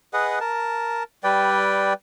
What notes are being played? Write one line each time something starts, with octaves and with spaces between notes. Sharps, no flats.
G#4 B4 D#5 F#5
A#4 A5
G3 B4 D5 G5